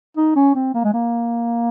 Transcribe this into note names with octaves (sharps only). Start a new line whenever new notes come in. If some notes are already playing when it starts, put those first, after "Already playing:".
D#4
C#4
C4
A#3
G#3
A#3